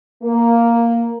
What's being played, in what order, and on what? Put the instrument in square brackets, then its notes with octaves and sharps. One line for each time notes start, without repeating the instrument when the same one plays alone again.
[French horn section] A#3